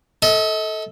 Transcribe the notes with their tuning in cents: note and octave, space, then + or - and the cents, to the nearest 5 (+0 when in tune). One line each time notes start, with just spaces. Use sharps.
A4 +0 D#5 +40